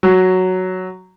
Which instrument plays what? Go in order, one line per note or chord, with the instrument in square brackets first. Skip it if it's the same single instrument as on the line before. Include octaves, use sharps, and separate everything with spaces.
[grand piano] F#3